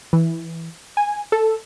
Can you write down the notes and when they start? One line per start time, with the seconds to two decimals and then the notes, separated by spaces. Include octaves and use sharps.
0.13 E3
0.97 G#5
1.32 A4